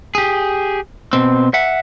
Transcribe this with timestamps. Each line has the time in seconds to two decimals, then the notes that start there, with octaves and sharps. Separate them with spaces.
0.15 G4 G#4
1.13 B2 C4
1.54 E5 F#5